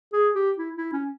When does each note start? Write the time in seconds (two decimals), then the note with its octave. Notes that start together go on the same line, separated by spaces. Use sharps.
0.13 G#4
0.35 G4
0.58 E4
0.76 E4
0.93 C#4